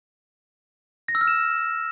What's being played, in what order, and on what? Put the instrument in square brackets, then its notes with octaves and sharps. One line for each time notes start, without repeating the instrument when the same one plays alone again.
[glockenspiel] A#6
E6
F6
E7